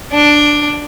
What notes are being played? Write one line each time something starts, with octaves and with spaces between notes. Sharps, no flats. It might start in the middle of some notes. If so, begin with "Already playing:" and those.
D4